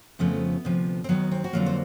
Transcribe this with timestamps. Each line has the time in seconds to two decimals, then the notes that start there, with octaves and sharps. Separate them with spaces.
0.19 F2 C#3 F3 A3 B3
0.65 D2 C3 F3
1.04 C4
1.09 D#2 D#3 F#3 B3
1.32 C4
1.44 F#4
1.53 F2 D3 F#3 A#3 F4
1.66 C5